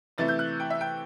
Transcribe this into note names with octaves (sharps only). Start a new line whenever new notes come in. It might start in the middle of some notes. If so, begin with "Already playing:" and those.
C3 E3 A3 E4 A6
G6
F#6
G5
E5
G5